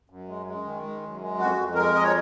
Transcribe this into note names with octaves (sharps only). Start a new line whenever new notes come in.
F#2
G#3
G#3
D#3
G#3
F#2
G#3
F2 F#4
F2
G#3 A#4
F2 D#5
C#5